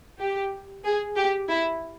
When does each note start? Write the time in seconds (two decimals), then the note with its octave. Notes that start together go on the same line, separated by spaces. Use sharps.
0.19 G4
0.84 G#4
1.16 G4
1.49 E4